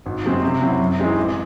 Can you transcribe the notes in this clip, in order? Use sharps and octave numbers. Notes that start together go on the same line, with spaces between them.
G#1
F#2 C#3 G#3 C4
C3
F#3 C4 E4 C5
F#2
E3 G#3 C4 D#4
A1